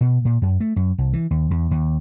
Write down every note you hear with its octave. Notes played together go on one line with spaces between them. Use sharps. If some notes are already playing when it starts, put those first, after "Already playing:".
B2
A#2
F#2
A3
F#2
C2
E3
D#2
E2
D#2